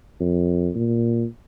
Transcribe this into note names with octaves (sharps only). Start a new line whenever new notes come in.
F2
A#2